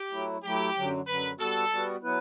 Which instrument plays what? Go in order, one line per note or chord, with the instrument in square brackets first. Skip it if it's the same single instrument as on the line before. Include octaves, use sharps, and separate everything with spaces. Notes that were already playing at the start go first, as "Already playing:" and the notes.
Already playing: [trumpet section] G4
[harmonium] F#3 A3 E4
[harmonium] F#3 A3 E4 [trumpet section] G4
[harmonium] F#2 D3 F#3
[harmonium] F#2 D3 F#3 [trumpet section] B4
[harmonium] G3 B3 F#4 [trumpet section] A4
[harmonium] G3 B3 F#4
F#3 B3 E4 B4